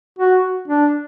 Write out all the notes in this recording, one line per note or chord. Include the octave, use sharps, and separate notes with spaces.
F#4
D4